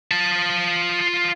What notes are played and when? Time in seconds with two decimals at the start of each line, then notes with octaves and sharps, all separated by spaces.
0.11 F4 A5